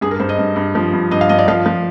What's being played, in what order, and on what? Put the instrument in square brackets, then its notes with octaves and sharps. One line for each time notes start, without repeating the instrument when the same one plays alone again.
[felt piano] G2 G#4
A#4
G2 C5
D#5
G2
G2
F3
G2
G2 D#5
F5
G2 D#5
D5
F3 F5
F3